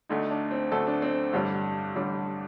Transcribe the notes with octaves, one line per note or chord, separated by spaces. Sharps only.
D2 D3 A3 D#4
D4
C4
D2 D3 A3 A4
D4
C4
A1 G2 D3 G3
A1 G2 D3 G3